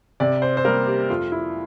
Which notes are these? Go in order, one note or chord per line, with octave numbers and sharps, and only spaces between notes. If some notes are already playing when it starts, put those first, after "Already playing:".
C3 D5
C5
C5
G3 A#3 A#4
G4
F2 F4
E4